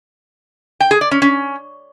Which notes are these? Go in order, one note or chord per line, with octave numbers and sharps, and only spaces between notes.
G5
G#4
D5
C#4
C#4